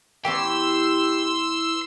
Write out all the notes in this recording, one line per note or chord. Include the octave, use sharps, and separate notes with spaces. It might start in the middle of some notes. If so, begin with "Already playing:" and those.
E3 B3 C#4 G4 C6 E6